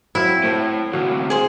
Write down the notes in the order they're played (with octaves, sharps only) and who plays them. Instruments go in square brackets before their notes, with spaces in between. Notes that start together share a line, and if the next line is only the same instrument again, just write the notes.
[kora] F#3 C4 F5 [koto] E4
[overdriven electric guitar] A2 [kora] A3 C5
[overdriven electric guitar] D2 C3 [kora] F#4 C#5 F5
[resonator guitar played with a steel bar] G#4 C5